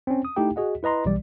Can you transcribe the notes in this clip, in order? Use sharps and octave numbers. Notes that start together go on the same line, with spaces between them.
C4 C#4
D#6
A3 D#4 E4 G4 G5
F#4 G#4 D#5 F#5
E4 B4 D#5 A#5 C6
B1 E3 G3 D5